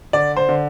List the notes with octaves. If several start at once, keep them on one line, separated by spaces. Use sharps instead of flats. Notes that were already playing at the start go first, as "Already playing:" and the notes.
D3 D5
C5
D3